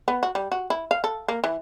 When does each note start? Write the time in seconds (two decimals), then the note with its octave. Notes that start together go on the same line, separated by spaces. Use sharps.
0.08 B3
0.23 F#4
0.35 G3
0.52 F#4
0.70 E4
0.91 F5
1.04 A4
1.28 A#3
1.44 E3